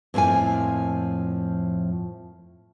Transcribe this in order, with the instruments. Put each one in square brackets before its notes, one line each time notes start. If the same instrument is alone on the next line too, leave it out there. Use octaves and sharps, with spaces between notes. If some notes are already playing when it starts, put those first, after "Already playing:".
[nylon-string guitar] F2 A2 F3 A#3 G#5